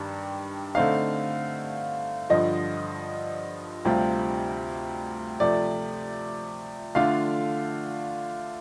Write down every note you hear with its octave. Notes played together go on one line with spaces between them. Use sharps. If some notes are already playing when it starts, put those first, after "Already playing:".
Already playing: G2 D#3 G3 D4
D3 A3 C4 D#4 F5
G2 D3 F3 D#5
D2 C3 G3 C4 F4
C3 F3 A3 D5
D3 A3 D4 F4 F5